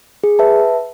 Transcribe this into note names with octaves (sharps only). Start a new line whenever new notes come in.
G#4
B4 E5 A5